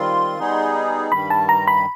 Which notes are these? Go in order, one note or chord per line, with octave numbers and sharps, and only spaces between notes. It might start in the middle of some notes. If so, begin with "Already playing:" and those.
Already playing: D#3 G3 C4 F4 C6
G3 B3 D#4 G#4
G2 D#3 G3 B5
A5
A#5
B5